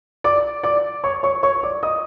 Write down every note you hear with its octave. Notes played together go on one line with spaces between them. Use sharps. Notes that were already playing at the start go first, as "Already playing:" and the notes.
D5 D6
D5 D6
C#5 C#6
C#5 C#6
C#5 C#6
D5 D6
D#5 D#6